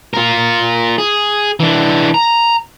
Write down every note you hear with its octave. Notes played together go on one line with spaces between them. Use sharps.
F4 A#4
G#4
E3 D4
A#5